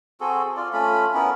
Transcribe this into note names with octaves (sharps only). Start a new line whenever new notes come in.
C4 F#4 G#4 A4
F4 D5
A3 C#4 F4 B5
B3 C#4 E4 A#4